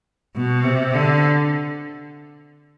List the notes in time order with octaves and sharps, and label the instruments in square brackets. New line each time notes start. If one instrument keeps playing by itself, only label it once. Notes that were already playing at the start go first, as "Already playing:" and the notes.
[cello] B2
C3
D3